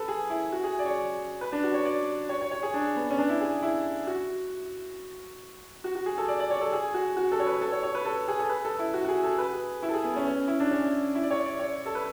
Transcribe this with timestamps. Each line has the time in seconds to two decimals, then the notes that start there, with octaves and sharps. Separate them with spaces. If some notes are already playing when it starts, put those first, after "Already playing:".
Already playing: A4 B4
0.08 G#4
0.30 E4
0.52 F#4
0.64 G#4
0.79 D5
0.85 C#5
1.41 B4
1.52 D4
1.63 F#4
1.74 C#5
1.85 D5
2.29 C#5
2.41 C#5
2.51 C#5
2.63 G#4
2.74 D4
2.96 B3
3.10 C#4
3.18 D4
3.29 E4
3.41 G#4
3.63 E4
4.07 F#4
5.84 F#4
5.95 F#4
6.06 G#4
6.18 A4
6.28 D5
6.40 D5
6.50 C#5
6.61 A4
6.73 G#4
6.94 F#4
7.17 F#4
7.32 A4
7.40 C#5
7.46 B4
7.61 A4
7.72 C#5
7.83 C#5
7.95 B4
8.05 A4
8.28 G#4
8.39 A4
8.49 B4
8.65 A4
8.79 E4
8.94 F#4
9.04 F#4
9.09 G#4
9.23 A4
9.38 B4
9.53 G#4
9.83 E4
9.89 A4
9.94 G#4
10.04 B3
10.16 C#4
10.27 C#4
10.48 E4
10.60 D4
10.71 C#4
11.15 E4
11.23 D5
11.31 C#5
11.45 D5
11.60 C#5
11.86 A4
11.95 B4